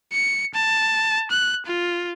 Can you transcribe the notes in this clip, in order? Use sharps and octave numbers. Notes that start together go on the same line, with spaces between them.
C#7
A5
F#6
F4